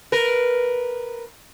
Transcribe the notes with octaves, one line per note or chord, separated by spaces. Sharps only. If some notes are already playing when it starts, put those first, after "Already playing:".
A#4 B4